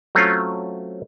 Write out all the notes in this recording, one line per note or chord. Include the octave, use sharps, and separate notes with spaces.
F#3 A3 C4 C#4 F4